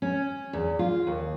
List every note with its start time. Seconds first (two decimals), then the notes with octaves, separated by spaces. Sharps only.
0.02 C#4
0.53 E2
0.79 F4
1.07 D#2